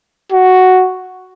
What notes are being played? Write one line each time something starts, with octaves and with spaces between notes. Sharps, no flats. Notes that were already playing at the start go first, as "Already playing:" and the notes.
F#4